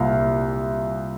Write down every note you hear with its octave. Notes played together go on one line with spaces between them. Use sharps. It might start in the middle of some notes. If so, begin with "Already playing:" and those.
Already playing: C2 A#2 F5